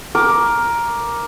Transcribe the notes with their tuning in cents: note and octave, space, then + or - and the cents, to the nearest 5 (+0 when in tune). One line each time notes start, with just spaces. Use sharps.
A#4 +10 D6 +0